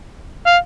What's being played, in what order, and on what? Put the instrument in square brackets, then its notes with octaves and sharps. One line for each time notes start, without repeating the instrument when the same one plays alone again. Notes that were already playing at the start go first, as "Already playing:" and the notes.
[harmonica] F5